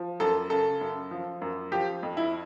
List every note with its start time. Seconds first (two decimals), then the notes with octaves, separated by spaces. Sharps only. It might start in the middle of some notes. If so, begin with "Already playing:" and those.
Already playing: F3
0.20 F#2 A4
0.50 C#3 A4
0.81 F#2
1.11 F3
1.42 F#2
1.72 F3 G4
2.03 F2
2.17 E4